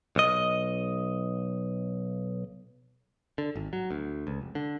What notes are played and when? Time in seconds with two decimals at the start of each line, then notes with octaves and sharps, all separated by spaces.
0.16 B1 D#5
3.38 D3
3.55 G#1
3.73 F#3
3.90 D2
4.27 C#2
4.41 F1
4.55 D3